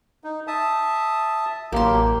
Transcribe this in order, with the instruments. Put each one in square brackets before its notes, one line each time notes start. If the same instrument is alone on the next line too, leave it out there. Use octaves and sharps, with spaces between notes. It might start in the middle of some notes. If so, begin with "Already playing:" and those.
[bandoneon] D#4
E5 A5 D#6
[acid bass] A1 [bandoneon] F#3 G4 [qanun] A#3 C6